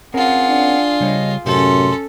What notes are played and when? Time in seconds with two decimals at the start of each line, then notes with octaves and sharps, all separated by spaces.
0.14 C4 C#4 F4 G#4 A#4 F#5
0.49 D4
1.00 C#3 G3 C#5 D#5
1.46 F#2 A2 C3 C#4 G4 A4 C6